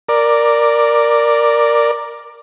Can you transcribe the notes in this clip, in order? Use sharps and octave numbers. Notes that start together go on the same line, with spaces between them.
A#4 D5